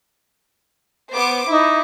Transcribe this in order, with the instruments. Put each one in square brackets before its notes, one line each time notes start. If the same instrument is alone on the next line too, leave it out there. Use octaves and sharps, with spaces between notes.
[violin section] B3 C5 D6
[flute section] D#4 D6 [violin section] E4